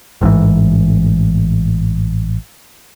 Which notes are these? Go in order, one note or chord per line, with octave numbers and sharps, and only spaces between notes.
A1 G#2 B2 E3